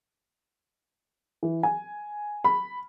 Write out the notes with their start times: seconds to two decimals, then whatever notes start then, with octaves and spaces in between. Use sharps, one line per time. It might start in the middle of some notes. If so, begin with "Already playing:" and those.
1.43 E3
1.63 G#5
2.44 B5